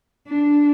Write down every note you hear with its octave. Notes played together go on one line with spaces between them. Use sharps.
D4